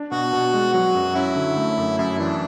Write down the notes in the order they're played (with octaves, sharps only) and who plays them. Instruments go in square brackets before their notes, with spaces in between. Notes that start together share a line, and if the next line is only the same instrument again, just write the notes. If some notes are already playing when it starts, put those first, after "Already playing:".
Already playing: [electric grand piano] D4
[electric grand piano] B2 [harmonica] F#4
[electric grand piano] B2
G#3
[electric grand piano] F#3 [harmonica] F#4
[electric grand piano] F#2
[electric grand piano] C#4 [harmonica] E4
[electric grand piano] D3
A3
F#2
[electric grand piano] F#2 [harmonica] E4
[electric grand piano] E3 [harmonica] D4